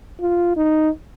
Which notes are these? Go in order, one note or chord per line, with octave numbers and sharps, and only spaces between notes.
F4
D#4